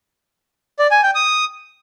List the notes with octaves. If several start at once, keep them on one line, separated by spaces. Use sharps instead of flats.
D5
G#5
G5
D#6